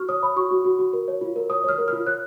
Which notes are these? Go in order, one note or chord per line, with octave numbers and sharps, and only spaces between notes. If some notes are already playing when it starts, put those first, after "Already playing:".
Already playing: F#4 C#6 F6
C#5 D#6
C#5 B5
F#4 C#6
F#4
F#4
F#4
A#4
C#5
F4
A#4
C#5 D#6
C#5 F6
A#4
F4 F6
C#5 F#6